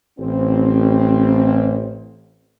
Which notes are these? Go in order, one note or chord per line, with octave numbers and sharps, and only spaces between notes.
A1 C4